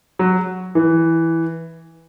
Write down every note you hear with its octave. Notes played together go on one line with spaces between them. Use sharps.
F#3
E3